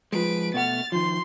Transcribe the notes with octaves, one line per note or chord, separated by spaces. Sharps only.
F3 G#3 B4 D7
B2 A3 F#5 F6 A6
D#3 F3 C6